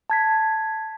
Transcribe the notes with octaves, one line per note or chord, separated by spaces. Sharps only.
A5 G#6 B6